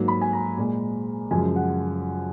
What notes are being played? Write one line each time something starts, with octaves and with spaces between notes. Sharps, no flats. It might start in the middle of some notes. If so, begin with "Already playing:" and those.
Already playing: G#2 F#3 A#3
B5
G#5
A#5
A#2 G#3
F#2 C#3 F3 G#3 G#5
F#5